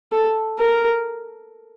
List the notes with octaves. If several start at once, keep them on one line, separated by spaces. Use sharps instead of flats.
A4
A#4